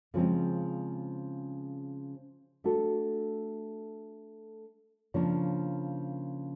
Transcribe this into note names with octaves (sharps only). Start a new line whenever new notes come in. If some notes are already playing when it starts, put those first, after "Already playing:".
C#3 F3 G#3 C4
A3 D4 F#4 A4
C#3 F3 A#3 D4